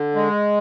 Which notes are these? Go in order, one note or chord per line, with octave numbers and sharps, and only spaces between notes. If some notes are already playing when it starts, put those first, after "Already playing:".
Already playing: D3
G#3